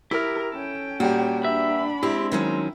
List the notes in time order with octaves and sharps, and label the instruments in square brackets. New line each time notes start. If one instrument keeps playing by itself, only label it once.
[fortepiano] E4 [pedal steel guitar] G4 F6 [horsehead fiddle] A#4
[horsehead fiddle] C#4 G5 [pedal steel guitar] A4
[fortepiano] A#2 G3 G4 [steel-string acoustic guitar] F#4
[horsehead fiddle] D4 B5 [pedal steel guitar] B4 E5
[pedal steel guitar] G#3 C4 [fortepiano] E4 [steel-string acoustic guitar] G4
[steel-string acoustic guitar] D#3 F#3 C#4